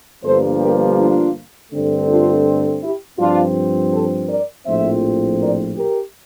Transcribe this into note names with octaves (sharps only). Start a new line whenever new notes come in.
G1 G2 F3 A#3 A4 C5
G4 A#4
D4 F4
G2 D3 A3 C4
D4 F4
E4 G4
G2 F3 C4 D4 F4
A4 C5
A#4 D5
A#1 A2 F3 C4 C5 E5
A#4 D5
G4 A#4